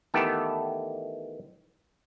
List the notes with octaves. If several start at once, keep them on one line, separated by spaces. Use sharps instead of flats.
D#3 E3 A3 B3 G4 A4